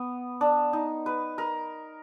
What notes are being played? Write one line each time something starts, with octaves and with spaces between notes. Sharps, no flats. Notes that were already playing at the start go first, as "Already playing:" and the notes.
Already playing: B3
D4
D#4
B4
A#4